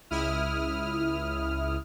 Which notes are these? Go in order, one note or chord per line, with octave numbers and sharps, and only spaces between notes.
C#2 E4 D#6 F6